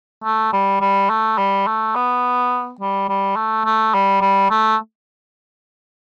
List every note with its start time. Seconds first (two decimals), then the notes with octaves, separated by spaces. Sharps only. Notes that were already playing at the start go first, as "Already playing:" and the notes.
0.24 A3
0.53 G3
0.81 G3
1.10 A3
1.38 G3
1.67 A3
1.95 B3
2.81 G3
3.09 G3
3.36 A3
3.65 A3
3.94 G3
4.21 G3
4.50 A3